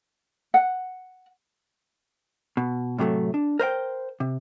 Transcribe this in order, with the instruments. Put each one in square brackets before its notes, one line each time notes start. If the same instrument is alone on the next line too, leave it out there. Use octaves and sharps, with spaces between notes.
[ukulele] F#5
[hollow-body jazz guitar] B2
A2 C3 F#3 G#3 A3
D4
A#4 C5 D#5 G5
C3